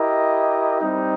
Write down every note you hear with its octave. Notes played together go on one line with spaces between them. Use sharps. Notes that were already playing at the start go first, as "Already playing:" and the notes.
Already playing: E4 G4 A#4 D#5
G3 C4 D#4